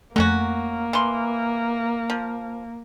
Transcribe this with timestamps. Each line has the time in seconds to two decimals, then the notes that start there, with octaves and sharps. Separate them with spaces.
0.16 F2 F#3 A3 A#3 C#4 F#4
0.93 E3 C6
2.10 F3